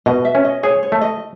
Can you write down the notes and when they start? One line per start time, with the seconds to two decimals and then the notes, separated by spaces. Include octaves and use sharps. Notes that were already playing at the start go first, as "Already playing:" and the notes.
0.06 B2 D#5
0.25 E5
0.35 C#4
0.45 D#5
0.63 G#4 C#5
0.83 C#5
0.92 A3
1.01 D#5